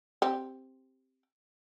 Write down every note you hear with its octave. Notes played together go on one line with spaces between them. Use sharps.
C4 G4